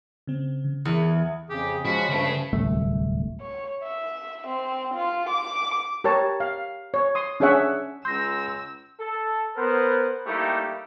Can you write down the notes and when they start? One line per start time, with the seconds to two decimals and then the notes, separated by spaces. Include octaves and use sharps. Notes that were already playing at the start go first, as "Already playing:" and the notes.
0.27 C#3 C4
0.64 C#3
0.85 E2 D#6 C#7
1.02 G#6
1.50 F2 C#3 G4 G#4
1.85 F3 G#3 C#4 F#4 B5
2.10 G2 C#3 F3 A3 C#4 B5
2.53 D1 C2 A3
3.41 C#5
3.84 E5
4.48 C4
4.95 F4
5.30 D6
6.04 G4 A#4 C#5 A5
6.40 F5
6.94 C#5
7.15 C6 D#6
7.40 C#4 D4 G#4 C#5 E5 F#5
8.05 C#2 C6 E6 G6 A#6
9.00 A4
9.56 B3 A#4 C5
10.26 G3 A3 A#3 D#4 E4 G4